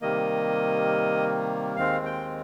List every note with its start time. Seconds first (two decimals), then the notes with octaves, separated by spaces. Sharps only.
0.01 C3 D#3 G3 A#3 D#5
1.76 D#2 D#3 G#3 C4 F5
2.06 G5